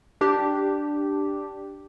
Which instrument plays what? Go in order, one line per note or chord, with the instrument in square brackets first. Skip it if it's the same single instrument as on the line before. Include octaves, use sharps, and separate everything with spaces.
[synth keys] D4 G4